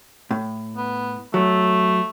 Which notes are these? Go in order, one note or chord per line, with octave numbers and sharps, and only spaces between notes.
A2
B3
F#3 A3